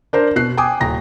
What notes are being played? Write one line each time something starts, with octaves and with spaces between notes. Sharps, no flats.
D4 A#4 C5
B2 F#6 C7
G5 G#5 D6 D#6
D#1 A#5 A#6